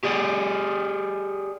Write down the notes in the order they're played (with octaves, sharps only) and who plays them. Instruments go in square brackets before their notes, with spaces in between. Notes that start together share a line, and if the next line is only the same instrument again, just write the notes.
[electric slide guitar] G4 G#4 D5